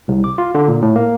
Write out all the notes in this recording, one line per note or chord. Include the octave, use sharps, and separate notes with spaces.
C2
D6
F4
D3
A#2
A2
A#3